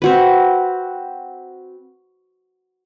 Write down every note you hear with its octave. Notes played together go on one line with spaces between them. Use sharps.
C4 F#4 B4